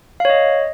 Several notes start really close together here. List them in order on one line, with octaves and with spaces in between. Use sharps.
F5 C#5 D#5